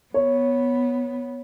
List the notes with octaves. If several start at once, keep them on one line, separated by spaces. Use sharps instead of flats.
B3 C#5